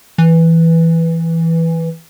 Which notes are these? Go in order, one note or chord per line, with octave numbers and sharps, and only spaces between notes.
E3